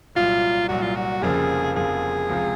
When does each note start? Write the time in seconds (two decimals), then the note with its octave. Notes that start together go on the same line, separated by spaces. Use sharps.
0.15 C2 A#2 F#3 F4
0.69 C2 A#2 F#3 F#4
0.82 F4
0.95 F#4
1.22 F1 F2 C#3 F3 A#3 G#4
1.75 F1 F2 C#3 F3 A#3 G#4
2.29 C#2 C3 F3 C4 F4